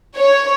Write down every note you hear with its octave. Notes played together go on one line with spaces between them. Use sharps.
C#5